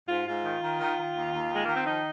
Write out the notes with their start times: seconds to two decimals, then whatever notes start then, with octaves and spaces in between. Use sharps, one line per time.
0.08 G#2 F4
0.26 G#2 F4
0.44 D#3
0.61 D#3
0.79 D#3
0.96 D#3
1.14 D#2
1.32 D#2
1.50 D#3
1.55 G#3
1.65 D#3 A#3
1.75 C4
1.85 F3 D#4